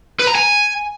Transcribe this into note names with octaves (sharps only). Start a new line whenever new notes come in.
B4
A#5
G#5